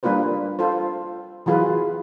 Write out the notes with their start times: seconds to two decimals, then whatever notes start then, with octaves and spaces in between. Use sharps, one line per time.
0.03 G3 A#3 D4 F4 B4 C5
0.59 F4 A4 C5
1.46 E3 F#3 F4 G#4 B4